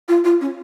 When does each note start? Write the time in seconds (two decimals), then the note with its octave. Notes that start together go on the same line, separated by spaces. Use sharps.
0.08 F4
0.24 F4
0.41 C#4